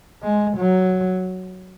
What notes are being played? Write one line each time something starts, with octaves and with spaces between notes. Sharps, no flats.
G#3
F#3